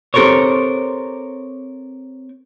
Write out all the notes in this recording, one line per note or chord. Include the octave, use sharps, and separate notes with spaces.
C4 G4 A4 A#4 C5 C#5